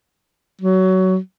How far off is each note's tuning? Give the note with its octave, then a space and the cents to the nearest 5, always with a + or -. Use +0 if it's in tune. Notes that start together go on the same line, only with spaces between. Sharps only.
F#3 +20